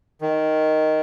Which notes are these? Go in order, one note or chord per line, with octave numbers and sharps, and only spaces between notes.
D#3